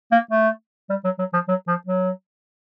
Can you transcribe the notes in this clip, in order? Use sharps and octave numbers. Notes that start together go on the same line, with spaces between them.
A#3
A3
G3
F#3
F#3
F3
F#3
F3
F#3